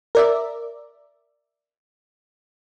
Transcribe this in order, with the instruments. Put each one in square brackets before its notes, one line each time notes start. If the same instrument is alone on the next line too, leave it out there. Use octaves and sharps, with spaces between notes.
[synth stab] A#4 D5 E5